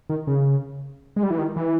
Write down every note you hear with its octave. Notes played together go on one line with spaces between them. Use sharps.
D#3
C#3
G#3
G3
E3
D#3
E3